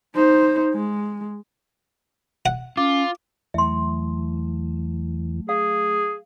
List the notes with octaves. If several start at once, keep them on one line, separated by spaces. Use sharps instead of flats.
D#4 C5
G#3
F#5
C#4 F4 D6
E2 E3 F#3 A3 E5 C6
G#4 F5